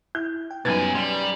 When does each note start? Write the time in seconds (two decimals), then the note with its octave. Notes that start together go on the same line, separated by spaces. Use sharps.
0.15 E4 G6
0.51 G5
0.65 F#2 B2 G3 D#4 B4 G#5 G#6 A6
0.95 G3 C6